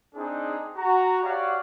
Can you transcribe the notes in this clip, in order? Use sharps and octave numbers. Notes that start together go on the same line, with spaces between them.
C4 D4 D#4 G#4
F#4 A#5
F#4 G4 C#5 D5 F5 F#5